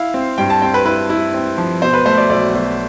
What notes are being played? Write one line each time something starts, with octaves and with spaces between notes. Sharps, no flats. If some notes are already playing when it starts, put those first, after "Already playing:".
Already playing: E4 F5
C4
G2 G5
A5
C4 G5
B4
E4 B4
E4
C4
F3
B2 C5
B4
A3 C5
D5
B1 D5
B1